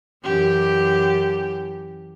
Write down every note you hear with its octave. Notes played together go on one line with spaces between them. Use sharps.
F#2 E3 G4